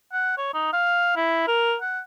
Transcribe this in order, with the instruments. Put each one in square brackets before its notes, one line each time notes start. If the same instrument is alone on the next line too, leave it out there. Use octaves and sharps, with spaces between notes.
[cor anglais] F#5
C#5
D#4
F5
E4
A#4
F#5